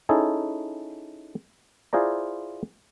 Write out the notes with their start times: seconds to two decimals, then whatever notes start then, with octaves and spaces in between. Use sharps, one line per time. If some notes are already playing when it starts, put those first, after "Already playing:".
0.09 C#4 D#4 E4 G#4 A4
1.93 E4 F4 G#4 C5 D5 A#5